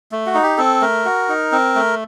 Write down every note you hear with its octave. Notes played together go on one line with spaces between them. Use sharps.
A3
F#4
D#4
G4
C4 A4
A3 A#4
F#4
D#4
C4
A3